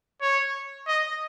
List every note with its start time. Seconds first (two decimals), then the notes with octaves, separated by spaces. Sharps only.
0.22 C#5
0.88 D#5